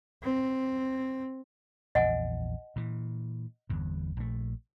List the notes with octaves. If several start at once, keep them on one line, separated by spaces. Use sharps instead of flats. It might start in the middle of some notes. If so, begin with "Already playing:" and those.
C4
A#1 E2 D#5 F#5 G#5
A#2 E3
G1 E2 G2
A#1 A3